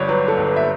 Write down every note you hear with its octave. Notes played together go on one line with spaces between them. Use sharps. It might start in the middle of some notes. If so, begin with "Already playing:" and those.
Already playing: G1 G2 C#5 D5
F#3 B4
A4
G1
B4
E5